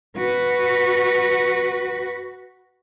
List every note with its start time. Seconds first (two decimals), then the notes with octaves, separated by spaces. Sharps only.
0.18 F#4 B4